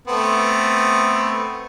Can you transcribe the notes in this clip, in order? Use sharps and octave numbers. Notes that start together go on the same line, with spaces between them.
A3 B3 C4